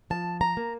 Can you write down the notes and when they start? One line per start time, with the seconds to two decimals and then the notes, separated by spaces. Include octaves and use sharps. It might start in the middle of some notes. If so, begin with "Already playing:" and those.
0.10 F3 A5
0.41 A#5
0.57 A#3